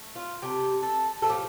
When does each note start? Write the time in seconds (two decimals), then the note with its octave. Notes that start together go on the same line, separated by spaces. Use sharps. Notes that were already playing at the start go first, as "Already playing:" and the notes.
Already playing: A3
0.16 F4
0.42 C3 A3 G4
0.82 A4
1.22 A2 F3 A3 A4
1.30 G4